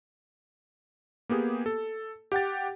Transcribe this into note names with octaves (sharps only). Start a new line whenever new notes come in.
A#3 B3 G4 G#4
A4
G4 F#5 G5 A6